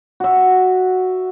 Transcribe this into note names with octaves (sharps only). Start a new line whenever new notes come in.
F#4 E5